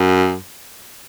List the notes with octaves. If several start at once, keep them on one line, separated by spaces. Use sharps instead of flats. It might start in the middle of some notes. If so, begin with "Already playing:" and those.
Already playing: F#2